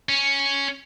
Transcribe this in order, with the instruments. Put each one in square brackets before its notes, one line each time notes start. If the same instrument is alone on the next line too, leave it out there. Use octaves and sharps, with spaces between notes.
[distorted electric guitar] C#4